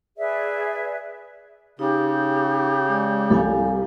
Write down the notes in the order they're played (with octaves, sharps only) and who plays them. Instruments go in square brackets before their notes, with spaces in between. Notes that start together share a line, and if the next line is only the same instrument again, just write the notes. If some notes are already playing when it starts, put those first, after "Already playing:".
[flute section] G#4 B4 D5 E5
[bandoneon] C#3 [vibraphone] D#4 [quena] G4
[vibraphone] G#3 D5
[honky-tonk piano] C2 F3 [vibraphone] A4 F5 G#5